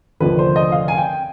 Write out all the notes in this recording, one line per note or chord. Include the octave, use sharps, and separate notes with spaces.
F1 D#2 D3 F3 B4
C5
D#5
F5
G#5
G5